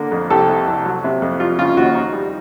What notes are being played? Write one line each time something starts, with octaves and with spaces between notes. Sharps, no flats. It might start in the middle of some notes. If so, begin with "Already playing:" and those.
Already playing: D3 A#3
F2
C2 G4 A4
C3
C2
F#3
C3
F2
G3 F4
C#3 F4
D#2 F#4
D#4
G3